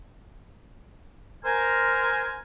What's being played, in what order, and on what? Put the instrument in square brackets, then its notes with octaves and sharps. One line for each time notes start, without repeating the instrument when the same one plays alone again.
[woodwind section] A#4 C5 G#5